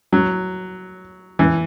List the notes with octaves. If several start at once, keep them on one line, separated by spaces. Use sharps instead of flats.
F#3
E3